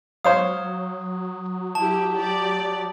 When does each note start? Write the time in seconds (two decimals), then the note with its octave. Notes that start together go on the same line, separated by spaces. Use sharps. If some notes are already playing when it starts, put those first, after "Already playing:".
0.25 F#3 C5 C#5 F5 D#6
1.75 E4 G4 A5
2.13 G4 D5